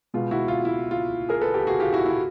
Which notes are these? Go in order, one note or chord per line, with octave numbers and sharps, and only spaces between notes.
B2 G#3 B3 F4
E4 F#4
F4
E4
F4
G#4 A#4
A4 B4
G4 A4
F#4 G#4
F4 G4
E4 F#4
E4